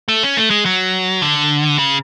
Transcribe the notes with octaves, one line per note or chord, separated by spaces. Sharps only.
A3
C#4
A3
G#3
F#3
D3
C#3